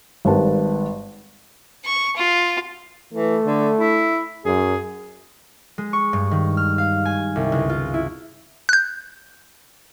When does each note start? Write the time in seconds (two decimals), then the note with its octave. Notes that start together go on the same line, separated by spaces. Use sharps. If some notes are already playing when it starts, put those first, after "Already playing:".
0.25 G#1 G3 A#4 B4 A5
1.85 C#6
2.16 F4
3.13 E3 A3
3.45 D3
3.78 E4
4.45 F#2 G#4
5.78 G#3
5.93 C#6
6.13 G2
6.31 D#3
6.57 F6
6.78 F5
7.05 G#5
7.36 C2
7.52 C#2
7.70 F4
7.94 E4
8.69 F#6 G6